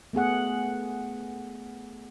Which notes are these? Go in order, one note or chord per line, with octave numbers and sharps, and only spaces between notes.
A3 B3 G#4 F#5